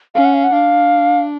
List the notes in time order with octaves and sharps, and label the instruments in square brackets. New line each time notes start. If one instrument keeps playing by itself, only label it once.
[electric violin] C#4 [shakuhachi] F5
[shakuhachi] F#5
F5
F#5
[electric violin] D4 [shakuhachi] F5